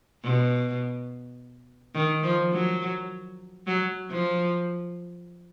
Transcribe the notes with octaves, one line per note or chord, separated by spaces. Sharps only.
B2
D#3
F3
F#3
F#3
F3